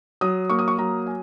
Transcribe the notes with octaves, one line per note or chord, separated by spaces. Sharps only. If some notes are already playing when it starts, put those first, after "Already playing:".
F#3 D#6
A#3 C#6
D#6
C#6
F#3 A#5
G#5